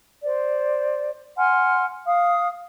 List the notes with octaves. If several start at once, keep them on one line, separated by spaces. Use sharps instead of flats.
C5 D5
F#5 G#5 C6 F6
F5 D#6